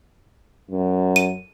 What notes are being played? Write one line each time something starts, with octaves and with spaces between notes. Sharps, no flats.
F#2
D#7